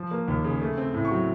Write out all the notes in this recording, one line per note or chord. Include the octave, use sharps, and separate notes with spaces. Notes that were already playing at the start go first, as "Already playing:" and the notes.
Already playing: F3
A#3
D#2
C#3
A3
C4
A2
C#6
F#3